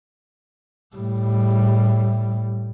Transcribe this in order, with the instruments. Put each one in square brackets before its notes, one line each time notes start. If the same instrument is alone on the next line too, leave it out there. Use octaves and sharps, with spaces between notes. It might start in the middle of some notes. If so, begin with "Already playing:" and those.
[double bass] A2 G3